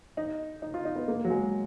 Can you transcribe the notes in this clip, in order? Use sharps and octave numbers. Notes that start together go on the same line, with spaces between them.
D#4
D#4
F4
D#4
B3
A#3
F#3
G#3